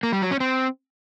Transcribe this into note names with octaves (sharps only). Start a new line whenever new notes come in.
A#3
G3
F#3
C#4
C4